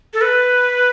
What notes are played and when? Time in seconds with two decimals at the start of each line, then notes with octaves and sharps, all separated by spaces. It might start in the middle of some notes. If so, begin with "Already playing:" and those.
0.14 A4
0.21 B4